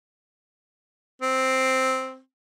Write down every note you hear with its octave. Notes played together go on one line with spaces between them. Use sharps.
C4